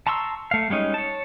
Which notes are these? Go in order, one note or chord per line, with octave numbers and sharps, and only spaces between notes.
A5 A#5 C6 C#6 E6
A3 F5
G3 G#3 C#4 D#4
C#5 A5